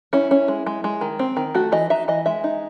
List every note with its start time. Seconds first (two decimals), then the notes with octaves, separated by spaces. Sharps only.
0.13 C#4 E4
0.31 C#4
0.48 G#3
0.67 G#3
0.84 G#3
1.01 D#3
1.19 C4
1.37 D#3
1.55 A3 F#4
1.72 E3 D#5
1.90 D#4 E5
2.08 E3 D#5
2.26 G#3 E5
2.44 D#4